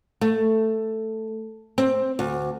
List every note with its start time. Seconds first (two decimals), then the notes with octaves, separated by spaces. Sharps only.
0.21 A3
1.78 C4
2.19 D2